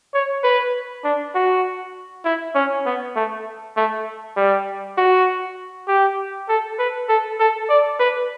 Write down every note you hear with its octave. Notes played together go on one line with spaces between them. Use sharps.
C#5
B4
D4
F#4
E4
C#4
B3
A3
A3
G3
F#4
G4
A4
B4
A4
A4
D5
B4